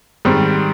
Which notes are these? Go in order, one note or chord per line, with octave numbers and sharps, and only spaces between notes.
G#2 D#3 G3 C4